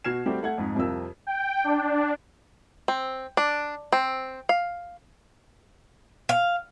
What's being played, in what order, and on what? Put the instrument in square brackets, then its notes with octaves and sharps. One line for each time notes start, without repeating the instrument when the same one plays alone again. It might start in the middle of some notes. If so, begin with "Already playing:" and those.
[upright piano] B2 F#4 F6 G#6 C7 E7
G3 A3 C4 F#4 G4
A3 F#5 G#6
F2 G#2
C2 F2 C4 F4 A#4 E6
[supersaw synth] G5
D4
[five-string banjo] C4
D4
C4
F5
[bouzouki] F5